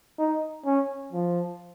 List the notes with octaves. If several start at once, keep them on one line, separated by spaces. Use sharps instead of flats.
D#4
C#4
F3